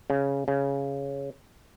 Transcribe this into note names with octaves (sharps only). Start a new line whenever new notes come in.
C#3
C#3